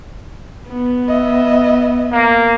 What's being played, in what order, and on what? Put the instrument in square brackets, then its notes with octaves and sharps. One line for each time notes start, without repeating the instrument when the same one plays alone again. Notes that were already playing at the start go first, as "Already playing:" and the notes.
[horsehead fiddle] B3
[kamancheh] D#5 E5
[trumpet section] A#3